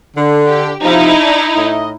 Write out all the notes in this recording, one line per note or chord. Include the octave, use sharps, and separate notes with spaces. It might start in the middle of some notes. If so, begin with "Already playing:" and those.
D3
G4
C3 F3 D#4 E4
D4
A2 D#5